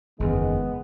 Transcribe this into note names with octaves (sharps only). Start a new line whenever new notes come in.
F#1 E2 D#3 G#3 B3